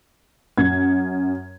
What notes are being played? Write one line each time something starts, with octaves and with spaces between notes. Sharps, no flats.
F#2 G#6